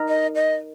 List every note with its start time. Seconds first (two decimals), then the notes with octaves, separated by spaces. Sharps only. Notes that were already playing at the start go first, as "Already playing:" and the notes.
Already playing: D#4 A#4
0.08 D#5
0.35 D#5